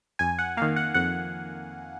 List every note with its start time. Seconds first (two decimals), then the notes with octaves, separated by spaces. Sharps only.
0.19 F2 G#5
0.39 F#5
0.57 D#3 A#3 F5
0.76 F#5
0.94 F2 F#5